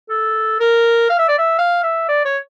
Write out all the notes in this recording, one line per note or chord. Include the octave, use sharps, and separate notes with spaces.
A4
A#4
F5
E5
D5
E5
F5
E5
D5
C#5